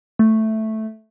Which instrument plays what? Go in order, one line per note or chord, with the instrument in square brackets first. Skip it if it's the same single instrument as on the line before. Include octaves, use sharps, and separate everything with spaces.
[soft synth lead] A3